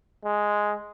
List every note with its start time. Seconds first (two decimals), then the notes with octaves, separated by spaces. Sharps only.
0.25 G#3